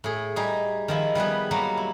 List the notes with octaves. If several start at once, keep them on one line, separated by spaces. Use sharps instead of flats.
A2 G#4
G3 D#4 G#4
D#3 F3 E4
G3 B3 G#4 B4
F#3 G3 A#3
E4